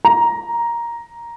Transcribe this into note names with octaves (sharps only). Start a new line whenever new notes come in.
A#5